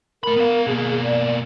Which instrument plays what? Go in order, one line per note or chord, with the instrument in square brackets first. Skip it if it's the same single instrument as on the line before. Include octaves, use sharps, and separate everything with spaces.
[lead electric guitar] A3 B5 [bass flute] A#4
[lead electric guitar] B3 F5
[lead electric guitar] B2 A#3 [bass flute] G#4
[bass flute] D5